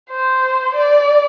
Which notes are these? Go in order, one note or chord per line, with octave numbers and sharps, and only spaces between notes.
C5
D5